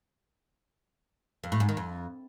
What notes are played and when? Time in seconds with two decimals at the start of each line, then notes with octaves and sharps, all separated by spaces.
1.44 F2
1.52 A2
1.60 G#2
1.69 D#3
1.77 F2